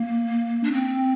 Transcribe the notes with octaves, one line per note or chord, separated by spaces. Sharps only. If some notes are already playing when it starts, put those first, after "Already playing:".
Already playing: A#3
D4
C4